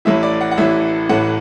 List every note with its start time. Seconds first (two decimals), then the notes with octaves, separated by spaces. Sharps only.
0.05 A1 A2 E3 E5
0.23 D5
0.41 F#5
0.51 F#5
0.57 A1 A2 E3 E5
1.09 A1 A2 E3 F#5